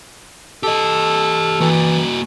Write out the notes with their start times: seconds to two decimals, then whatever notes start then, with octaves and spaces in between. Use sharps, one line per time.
0.63 G4 A4 D#5
1.60 E3 A#3 F#4